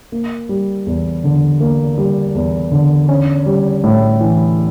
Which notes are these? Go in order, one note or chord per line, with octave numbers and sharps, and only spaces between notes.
A#3
G3
E2
D3
A#3
G3
E2
D3
C#4
G3
A2
E3